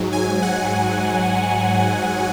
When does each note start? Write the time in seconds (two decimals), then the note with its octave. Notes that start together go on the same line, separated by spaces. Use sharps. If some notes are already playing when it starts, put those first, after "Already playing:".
Already playing: G#2 F#3
0.13 G#5
0.42 F#5